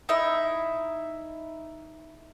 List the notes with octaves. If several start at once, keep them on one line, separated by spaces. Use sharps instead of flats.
D#4 E4 E5